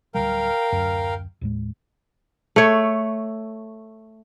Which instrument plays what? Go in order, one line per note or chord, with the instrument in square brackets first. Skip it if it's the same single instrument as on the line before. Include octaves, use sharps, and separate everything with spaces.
[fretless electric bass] D1 D#2 G3 [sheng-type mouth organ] A#4 F5 G5
[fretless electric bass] D1 F#2
D#2 A2 G#3
[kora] A3 C#5